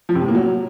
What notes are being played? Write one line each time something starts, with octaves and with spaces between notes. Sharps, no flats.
F3
C3
A2
A#3
F#3